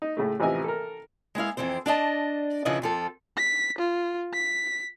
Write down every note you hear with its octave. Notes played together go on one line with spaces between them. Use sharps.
D#4
A2 C#3 A3
A1 C3 E3 F3 D#5 G#5
A4 A#4
G#3 B3 E4 F5
F2 A#2 E3 C4 C5
D4 D5 D#5 A5
C#3 F3 D4 E4 B4 D#5
F2 F3 A4
B6
F4
B6